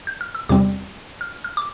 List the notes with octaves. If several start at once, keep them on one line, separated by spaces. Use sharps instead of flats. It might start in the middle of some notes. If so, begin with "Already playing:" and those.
G6
F6
E6
E2 C3 G3 C4 D6
F6
F6
D6